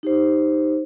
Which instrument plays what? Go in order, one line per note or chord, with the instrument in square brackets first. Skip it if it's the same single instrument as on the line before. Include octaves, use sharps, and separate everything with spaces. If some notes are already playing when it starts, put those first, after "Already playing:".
[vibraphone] D#4 G4 C5